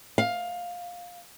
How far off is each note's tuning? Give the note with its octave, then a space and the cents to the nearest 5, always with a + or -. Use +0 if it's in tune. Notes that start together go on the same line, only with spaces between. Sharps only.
F5 +15